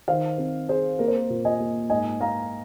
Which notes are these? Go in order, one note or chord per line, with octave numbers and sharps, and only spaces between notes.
D#3 C5 F5
C4
C4 G#4 C5
A#3 A#4
C5
A#4
A#2
D#5 G#5
A#3
G#2 D#5 G#5
A#3 F5 A#5